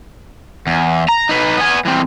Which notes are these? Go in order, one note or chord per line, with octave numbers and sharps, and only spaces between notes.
E2
A#5
D#4 B4
B3 G#5
E3 C4